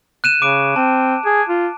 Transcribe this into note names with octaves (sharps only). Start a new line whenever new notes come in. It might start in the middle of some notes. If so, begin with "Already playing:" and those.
F#6 D#7 E7
C#3 D6 D7
C4 A5
G#4
F4